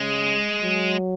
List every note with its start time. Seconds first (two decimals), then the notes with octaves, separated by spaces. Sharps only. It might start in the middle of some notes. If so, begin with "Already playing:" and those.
Already playing: C#3 G#3
0.63 F#3